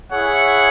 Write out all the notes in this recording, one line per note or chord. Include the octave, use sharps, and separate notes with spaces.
E4 G#4 C#5 F#5